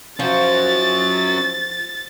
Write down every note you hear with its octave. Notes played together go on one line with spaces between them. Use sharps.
F3 C#4 F#4 A6